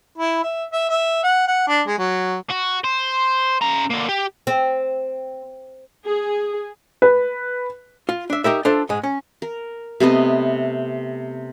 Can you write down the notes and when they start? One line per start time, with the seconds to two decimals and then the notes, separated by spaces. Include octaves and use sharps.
0.18 E4
0.43 E5
0.72 E5
0.89 E5
1.24 F#5
1.48 F#5
1.68 D4
1.87 G#3
1.98 F#3
2.50 F#4
2.84 C5
3.61 C#3 A#5
3.90 D3 A#3
4.09 G4
4.47 C4
6.06 G#4
7.02 B4
8.09 F4
8.30 D4 E5
8.44 D#4 G4 A#4 E5
8.65 D4 F4 A4 C5 E5
8.89 G#2 G#3
9.03 C#4
9.42 A#4
10.00 C3 A3 B3 D#5